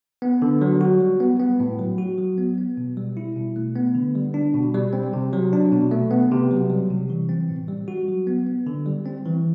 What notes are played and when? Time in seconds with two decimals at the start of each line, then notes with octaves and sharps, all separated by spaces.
0.22 B3
0.42 D3
0.61 F#3
0.81 F#4
1.01 G3
1.20 B3
1.39 B3
1.60 A2
1.79 F#3
1.98 F#4
2.18 F#3
2.38 B3
2.58 B3
2.77 B2
2.97 G3
3.17 E4
3.36 B2
3.56 A3
3.76 B3
3.95 D3
4.15 G3
4.34 D4
4.55 B2
4.74 G3
4.93 C4
5.13 C3
5.33 F#3
5.53 D4
5.72 B2
5.91 A3
6.11 B3
6.31 C3
6.51 F#3
6.70 G3
6.90 C3
7.10 E3
7.29 C4
7.49 A2
7.68 G3
7.88 F#4
8.08 F#3
8.27 B3
8.47 B3
8.67 D3
8.86 G3
9.05 C4
9.26 E3